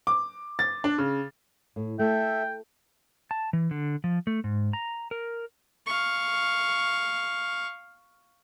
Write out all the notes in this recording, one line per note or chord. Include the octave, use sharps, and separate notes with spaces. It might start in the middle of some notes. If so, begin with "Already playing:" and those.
D6
A6
D4
C#3
A2
A3 A4 E5 G5
A5
E3
D3
F3
A3
G#2
A#5
A#4
F5 C#6